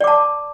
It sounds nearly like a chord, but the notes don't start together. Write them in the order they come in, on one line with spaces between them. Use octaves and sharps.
D5 D6 A5